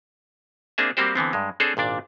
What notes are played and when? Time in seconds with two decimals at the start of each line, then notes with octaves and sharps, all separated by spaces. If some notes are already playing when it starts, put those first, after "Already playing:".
0.78 A#3 C4 D4 G#4 E5
0.97 G3 A#3 C4 F#4 G4 C5
1.15 D3 E3 B3 C4
1.33 G2 G#3
1.60 C4 D4 G#4 A4 C5 C#5
1.77 G#1 A#2 D4 D5